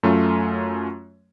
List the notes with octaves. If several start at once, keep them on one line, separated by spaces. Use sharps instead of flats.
F#2 A3 C#4 F4